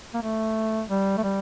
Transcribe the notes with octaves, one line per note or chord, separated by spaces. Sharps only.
A#3
A3
G3
A3
G3